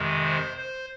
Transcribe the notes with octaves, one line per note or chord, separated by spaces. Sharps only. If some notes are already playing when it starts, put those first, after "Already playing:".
Already playing: F2 C3 D#3 G#3
C5
C5